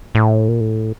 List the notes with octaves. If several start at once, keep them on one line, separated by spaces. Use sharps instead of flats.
A2
A#2
A2